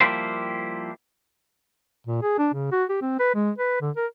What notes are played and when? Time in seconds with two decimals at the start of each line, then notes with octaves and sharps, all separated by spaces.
0.01 F3 G3 A#3 E4 G4 C5
2.07 A#2
2.22 G#4
2.38 D4
2.54 C#3
2.72 F#4
2.89 G4
3.02 C4
3.20 B4
3.35 G#3
3.58 B4
3.81 D3
3.97 A#4